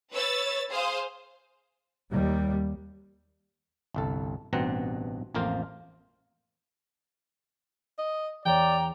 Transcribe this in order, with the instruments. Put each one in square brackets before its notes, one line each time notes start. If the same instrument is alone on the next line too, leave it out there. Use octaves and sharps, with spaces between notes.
[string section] B4 C#5 E6 A6
G#4 C5 F5 D#6
[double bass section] D#2 G3
[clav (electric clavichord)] G1 C2 A4
A1 G2 B2 C4 F#5 A#5
A1 F2 A#3 F4 A#4 C5
[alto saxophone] D#5
[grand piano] E2 C#5 [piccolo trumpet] D5 [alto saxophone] G5 [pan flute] A#5